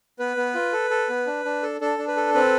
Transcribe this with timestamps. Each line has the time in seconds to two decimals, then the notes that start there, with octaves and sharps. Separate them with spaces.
0.19 B3 B4
0.37 B3
0.55 F4
0.73 A4
0.90 A4
1.09 B3
1.27 D4
1.45 D4
1.63 A4
1.81 D4 A4
1.99 D4
2.08 B4
2.17 A4
2.34 C4 B4